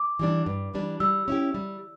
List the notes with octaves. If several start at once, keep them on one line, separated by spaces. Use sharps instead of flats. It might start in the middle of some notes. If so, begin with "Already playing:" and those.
Already playing: D6
E3 G3 D4
G2
E3 G3 D4
G3 E6
C#4 E4 G4
G3